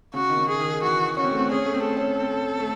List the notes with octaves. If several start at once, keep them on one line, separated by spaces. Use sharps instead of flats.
C#3 F#4
D#3
C#3
G#4
D#3
E3 F#4
C#4 F#4
C4
A3
C4
C#4 G#4
A3
C4
A4
C#4
C4
A3